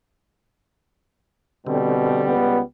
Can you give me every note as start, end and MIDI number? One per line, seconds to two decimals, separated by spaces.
1.67 2.38 47
1.67 2.35 50
1.67 2.61 55
1.67 2.35 60
2.25 2.60 37
2.25 2.60 59